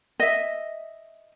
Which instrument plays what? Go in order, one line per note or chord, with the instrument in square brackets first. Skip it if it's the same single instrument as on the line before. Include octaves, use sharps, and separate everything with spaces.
[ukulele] D#5 E5